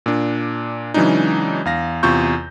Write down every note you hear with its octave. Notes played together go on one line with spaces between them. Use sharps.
A#2 D4
C#3 E3 F#3 G#3 D4 D#4
E2 F5 A#6
E2 C3 F4 C#6 G6